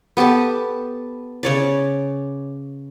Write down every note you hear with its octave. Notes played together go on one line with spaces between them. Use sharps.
B3 G4 A4 A5
C#3 C#5 D5